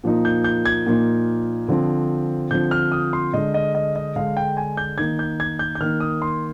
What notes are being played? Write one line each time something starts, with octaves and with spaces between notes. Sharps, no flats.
A#2 F3 A#3 D#4
G6
G6
G#6
A#2 F3 A#3 D#4
D3 F3 C4
D3 F3 C4 G6
F6
D#6
C6
D3 G#3 D4 D#5
D#5
D#5
D#5
D3 G#3 D4 F5
G5
G#5
G6
D#3 A#3 D#4 G#6
G6
G#6
G6
G6
D#3 A#3 D#4 F6
D#6
C6